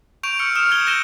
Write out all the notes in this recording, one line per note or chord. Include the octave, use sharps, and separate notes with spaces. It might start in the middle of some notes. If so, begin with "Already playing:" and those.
C#6 G6 D7 F7
E6 F6 C#7
D#6 F6 C#7 E7
G6 G#6 G7
F#6 G6 A#6 D#7 E7 G7